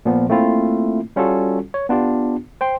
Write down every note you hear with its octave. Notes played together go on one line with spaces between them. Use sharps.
A#2 F3 B3
A3 A#3 C4 E4 F4
G3 C#4 F4 F#4 A4
C#5
B3 D4 F4 G4
C5 G5 C6